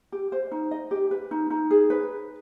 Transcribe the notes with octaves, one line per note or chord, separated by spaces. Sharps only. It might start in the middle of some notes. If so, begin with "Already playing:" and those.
G4
C5
D#4
D#5
G4
B4
D#4
D#4
G#4
B4